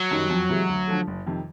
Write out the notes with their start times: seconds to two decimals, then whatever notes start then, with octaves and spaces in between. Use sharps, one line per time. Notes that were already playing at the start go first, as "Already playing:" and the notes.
Already playing: F#3
0.11 F#2 D#3 G3
0.30 F2
0.49 C3 E3 G#3
0.69 D2
0.88 D3 F3 A3
1.07 F#1
1.27 F2 C3 D#3 G3